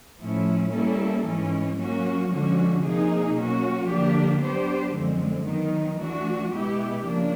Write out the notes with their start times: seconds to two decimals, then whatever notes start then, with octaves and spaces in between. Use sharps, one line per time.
0.21 A2 F3 A3 C#4 E4
0.73 G3 A#3 C#4 E4 A4
1.26 G#2 E3 G#3 C#4
1.79 F#3 A#3 C#4 F#4
2.31 D3 F3 G#3 C#4 F#4
2.84 C3 F3 A#3 D#4 G#4
3.36 B2 F#3 A#3 C#4 F#4
3.89 D3 F3 A#3 D4 G4
4.41 F#3 B3 D4 G4 C5
4.95 F#2 D3 F3 G#3 C4
5.46 D#3 F#3 B3 D#4
6.00 E3 A3 D4 F#4
6.52 B2 G#3 B3 E4 G4
7.04 C#3 F3 A#3 D4